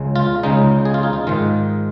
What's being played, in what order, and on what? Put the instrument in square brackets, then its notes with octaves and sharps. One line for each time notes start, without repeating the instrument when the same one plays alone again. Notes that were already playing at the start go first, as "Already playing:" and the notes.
Already playing: [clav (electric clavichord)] C#2 C#3 G#3
F4
C#2 C#3 G#3 D#4
G#4
F4
D#4
F4
G#2 D#3 G#3 F4